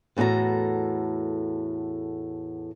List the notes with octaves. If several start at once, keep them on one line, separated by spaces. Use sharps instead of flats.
E2 A2 F#4 A4 A#5